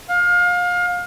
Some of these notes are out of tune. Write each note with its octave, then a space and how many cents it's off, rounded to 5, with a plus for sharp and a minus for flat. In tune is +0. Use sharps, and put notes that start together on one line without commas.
F5 +30